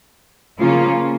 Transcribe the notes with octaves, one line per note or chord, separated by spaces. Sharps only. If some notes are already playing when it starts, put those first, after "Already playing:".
C#3 F3 A#3 C#4 F4